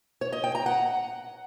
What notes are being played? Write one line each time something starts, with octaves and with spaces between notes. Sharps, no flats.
C#5
D#5
G5
A#5
F#5